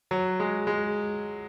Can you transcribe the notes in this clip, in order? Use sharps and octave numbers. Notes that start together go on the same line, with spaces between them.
F#3
G#3
G#3